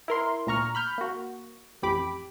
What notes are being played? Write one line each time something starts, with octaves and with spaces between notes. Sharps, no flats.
E4 A#4 C6
D2 A#2 A#5 C#6 F6
B5 F6 G6
A#3 F#4
A1 F2 G4 B5 D6